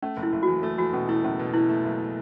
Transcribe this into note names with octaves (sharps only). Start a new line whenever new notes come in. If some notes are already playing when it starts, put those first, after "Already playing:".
A3 C#4
F#1
E4
F#1
F#4
E2
A3 A4
E2 F#4
B2 C#4
A3 E4
F#1 C#4
B2
B2 E4
A3
F#1